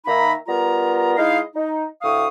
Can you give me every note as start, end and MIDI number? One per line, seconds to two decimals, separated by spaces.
0.06 0.32 51
0.06 0.32 58
0.06 0.32 63
0.06 0.32 76
0.06 0.32 82
0.06 0.32 83
0.47 1.12 55
0.47 1.12 59
0.47 1.12 65
0.47 1.12 70
0.47 1.12 82
1.16 1.39 56
1.16 1.39 63
1.16 1.39 64
1.16 1.39 75
1.16 1.39 77
1.54 1.84 63
2.02 2.28 38
2.02 2.28 45
2.02 2.28 77
2.02 2.28 85
2.02 2.28 87